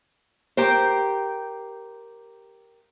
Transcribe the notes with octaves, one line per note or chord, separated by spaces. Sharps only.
G4 A#4 C5